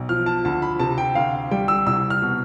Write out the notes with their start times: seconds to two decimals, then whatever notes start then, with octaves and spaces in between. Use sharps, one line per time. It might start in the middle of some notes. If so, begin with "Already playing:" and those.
Already playing: B1
0.09 F3 F6
0.26 A5
0.45 D2 A5
0.62 B5
0.79 C3 A5
0.98 G5
1.15 D2 F5
1.51 G3 G5
1.68 E6
1.86 C2 E6
2.10 F6
2.22 B2